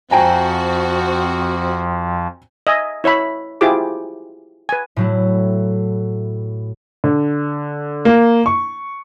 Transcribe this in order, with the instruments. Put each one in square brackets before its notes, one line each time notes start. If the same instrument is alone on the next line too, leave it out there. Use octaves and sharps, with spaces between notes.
[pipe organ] F2 F3 [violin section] C4 F#4 [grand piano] G5 G#5 A#5
[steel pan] D#5 E5 G#5
E4 C#5 E5 B5
E4 F4 G4 G#4 C5 D6
B4 G#5
[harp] A2 F#3 E4
[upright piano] D3
A#3
C#6